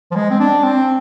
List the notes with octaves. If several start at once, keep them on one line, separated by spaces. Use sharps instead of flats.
F3
G#3
C4
D4
C4